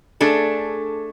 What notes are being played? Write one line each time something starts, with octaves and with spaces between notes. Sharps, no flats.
A3 D4 G#4 A4